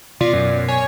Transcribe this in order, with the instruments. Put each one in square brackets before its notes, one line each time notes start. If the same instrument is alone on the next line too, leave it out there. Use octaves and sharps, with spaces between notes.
[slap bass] B2 [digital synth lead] F4 [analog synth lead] D5
[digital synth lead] F#2
[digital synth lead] C#5 [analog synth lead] G#5